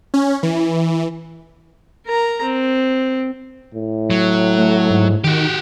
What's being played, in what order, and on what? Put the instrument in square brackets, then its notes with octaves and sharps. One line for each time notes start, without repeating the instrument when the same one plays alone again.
[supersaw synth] C#4
E3
[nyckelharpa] A#4 A#5
C4
[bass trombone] A2
[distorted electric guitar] F#3
[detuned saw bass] A3
G#2
[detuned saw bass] D#3 [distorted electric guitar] F#4 G4